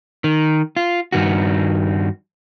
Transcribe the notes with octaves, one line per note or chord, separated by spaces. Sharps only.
D#3
F4
G2 D#3 F#4